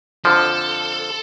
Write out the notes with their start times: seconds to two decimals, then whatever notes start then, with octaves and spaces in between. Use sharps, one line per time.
0.25 F2 D3 F3 A4